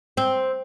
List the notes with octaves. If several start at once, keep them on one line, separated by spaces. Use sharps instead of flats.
C4